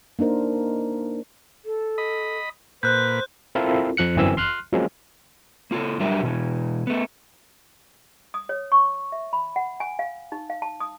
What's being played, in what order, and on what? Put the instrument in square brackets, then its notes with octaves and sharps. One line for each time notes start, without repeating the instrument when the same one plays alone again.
[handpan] A#3 D4 D#4 A#4 C5
[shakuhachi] A4
[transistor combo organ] D#5 B5
[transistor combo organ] A#2 B4 [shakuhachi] C5 [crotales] F#6 G6
[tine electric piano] C4 E4 F4 A4 A#4
F2 F3 F#6 C#7
G1 F#2 E3 C4 G#5 E6
C6 F6 F#6
F3 F#3 G#3 A#3 C4 C#4
[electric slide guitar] A#3 F4 F#4 A4
F#3 G3 D4 G4 A#4 E5
B2 E3
A3 B3
[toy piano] D#6
C#5
C#6
E5
B5
F#5
G#5
F5
D#4
F5
A5
D#6